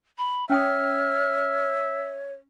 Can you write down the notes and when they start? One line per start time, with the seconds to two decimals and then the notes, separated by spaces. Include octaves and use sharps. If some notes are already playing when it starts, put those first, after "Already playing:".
0.18 B5
0.50 C#4 C#5 E5 G5 D#6 F6